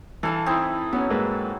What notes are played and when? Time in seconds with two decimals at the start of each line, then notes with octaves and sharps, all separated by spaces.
0.23 E3 A4 F5 A5
0.46 C4 D#4 E4
0.93 F#3 B3 C#4
1.10 G#2 A#3 B4